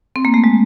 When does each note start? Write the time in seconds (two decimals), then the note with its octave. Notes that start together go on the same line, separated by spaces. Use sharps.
0.16 C4
0.25 A#3
0.34 A3
0.44 G#3